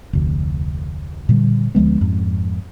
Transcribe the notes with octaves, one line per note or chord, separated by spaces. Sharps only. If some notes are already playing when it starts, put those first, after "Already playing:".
F1 D2
A#2 D3 G3
D2 F3 G#3 B3
F2 G#2